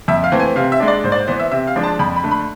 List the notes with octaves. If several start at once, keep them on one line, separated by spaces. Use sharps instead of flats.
F2 E5
F5
E3 A3 C4
G#5
C3 F5
E5
G#3 D4
D5
G#2 C5
D5
C5
E3 B3 C5
E5
C3 E5
F5
F3 G#3 D4
A5
F2 B5
B5
D3 A3
B5